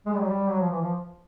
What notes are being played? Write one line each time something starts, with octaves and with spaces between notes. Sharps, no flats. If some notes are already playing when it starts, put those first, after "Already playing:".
G#3
G3
F#3
G3
F#3
F3
E3
F3